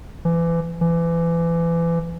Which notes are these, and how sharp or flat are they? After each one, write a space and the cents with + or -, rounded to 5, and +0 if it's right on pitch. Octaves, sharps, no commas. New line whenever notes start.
E3 +30
E3 +30